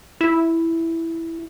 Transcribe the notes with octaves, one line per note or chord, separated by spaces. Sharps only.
E4